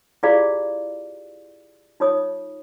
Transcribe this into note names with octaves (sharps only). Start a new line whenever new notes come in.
E4 F4 G4 G#4 D5 F5
D#4 F4 C#5 D#6